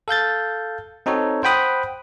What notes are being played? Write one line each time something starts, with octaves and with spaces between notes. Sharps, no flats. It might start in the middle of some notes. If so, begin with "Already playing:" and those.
A4 F5 G6 A6
C4 D#4 F#4 A4 C#5
C5 F#5 G5 B5 D#6 F#6